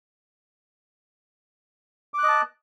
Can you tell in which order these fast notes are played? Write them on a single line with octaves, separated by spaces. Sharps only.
D6 F#6 D#5 A5